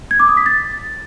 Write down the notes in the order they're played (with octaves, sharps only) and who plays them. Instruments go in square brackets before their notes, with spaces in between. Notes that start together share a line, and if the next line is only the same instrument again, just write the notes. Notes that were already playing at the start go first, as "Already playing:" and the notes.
[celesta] G#6
D6
D#6
B6
A6